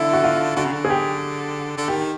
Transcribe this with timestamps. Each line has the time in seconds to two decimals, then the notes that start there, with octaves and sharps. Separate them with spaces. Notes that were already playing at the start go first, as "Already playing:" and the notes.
Already playing: D3 E4
0.13 F#4
0.24 F4
0.56 D3 F#4
0.65 C#3
0.73 D3
0.85 G#4
0.90 G4
1.77 D3
1.88 D#3 G4